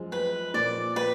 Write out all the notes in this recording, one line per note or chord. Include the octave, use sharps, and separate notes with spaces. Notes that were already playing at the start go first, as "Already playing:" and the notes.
Already playing: F#2 F3 G#3
B4
A#2 F3 A#3 D5
B4